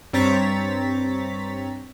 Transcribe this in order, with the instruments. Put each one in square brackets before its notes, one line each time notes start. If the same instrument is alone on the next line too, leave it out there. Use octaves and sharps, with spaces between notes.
[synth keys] G2 C4 C#5 A#5 A6 B6